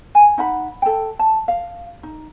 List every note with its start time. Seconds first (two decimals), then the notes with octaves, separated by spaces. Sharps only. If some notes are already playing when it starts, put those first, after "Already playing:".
0.15 G#5
0.38 D#4 F#5 B5
0.82 A4 G5
1.19 A5
1.48 F5
2.03 D#4